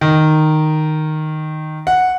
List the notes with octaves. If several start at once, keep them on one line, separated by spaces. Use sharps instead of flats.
D#3
F#5